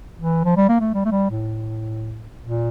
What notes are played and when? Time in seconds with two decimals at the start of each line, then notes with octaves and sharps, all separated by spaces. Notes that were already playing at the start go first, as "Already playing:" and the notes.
0.18 E3
0.45 F3
0.57 G3
0.69 A#3
0.80 A3
0.94 G3
1.05 A3
1.12 G3
1.31 A2
2.42 A#2